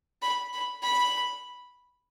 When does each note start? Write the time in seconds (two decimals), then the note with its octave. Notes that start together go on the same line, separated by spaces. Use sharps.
0.22 B5
0.53 B5
0.83 B5